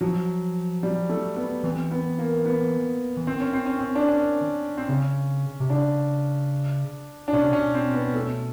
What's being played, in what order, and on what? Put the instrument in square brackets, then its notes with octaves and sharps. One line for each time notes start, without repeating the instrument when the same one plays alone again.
[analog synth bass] F3 [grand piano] F#3
[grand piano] G3
A3
B3
[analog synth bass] E3 [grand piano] C4
[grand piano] B3
A#3
B3
[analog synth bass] E3
[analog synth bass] D#3 [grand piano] C4
[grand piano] C#4
C4
C#4
C4
D4
C#4
C4
[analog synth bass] C#3 [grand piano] C#4
[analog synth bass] C3
[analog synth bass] C#3 [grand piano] D4
[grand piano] D4
[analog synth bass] B2 [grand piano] C#4
[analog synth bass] C3
[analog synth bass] B2 [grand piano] C#4
[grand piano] C4
B3
A3